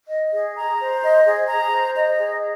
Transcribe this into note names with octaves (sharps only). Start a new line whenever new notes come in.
D#5
G#4
A#5
C5
D#5
G#4
A#5
C5
D#5
G#4